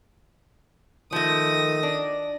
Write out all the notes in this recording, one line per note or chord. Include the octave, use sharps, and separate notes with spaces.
D#3 F3 A3 D#6 A#6
D4